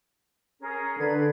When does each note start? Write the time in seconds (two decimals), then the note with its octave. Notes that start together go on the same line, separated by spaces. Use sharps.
0.60 C#4 G#4 A#4
0.98 D3 B4 D5 G#6